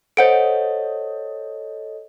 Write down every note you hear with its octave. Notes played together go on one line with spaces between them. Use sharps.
A4 C5 C#5 D#5 F#5 D7